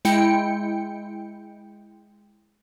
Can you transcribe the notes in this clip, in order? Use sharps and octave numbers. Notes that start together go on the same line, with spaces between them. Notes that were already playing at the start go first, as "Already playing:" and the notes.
G#3 E4 G5 C#7